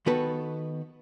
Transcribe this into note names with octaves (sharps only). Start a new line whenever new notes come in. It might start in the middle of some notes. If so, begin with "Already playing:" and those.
D#3 B3 F#4 A4 B4